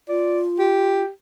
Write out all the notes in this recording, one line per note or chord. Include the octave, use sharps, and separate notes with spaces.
F4 D5
G4